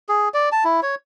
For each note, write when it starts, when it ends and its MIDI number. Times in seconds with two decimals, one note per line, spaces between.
0.09 0.29 68
0.34 0.49 74
0.52 0.64 81
0.64 0.80 64
0.82 0.95 73